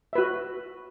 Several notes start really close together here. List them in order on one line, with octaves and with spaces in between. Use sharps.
E5 B4 F#4